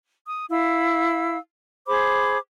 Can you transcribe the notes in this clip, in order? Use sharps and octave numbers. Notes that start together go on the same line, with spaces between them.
D#6
E4 F5 E6
G#4 C5 B5 D6